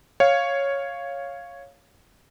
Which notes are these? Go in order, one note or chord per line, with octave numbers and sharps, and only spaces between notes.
C#5 F5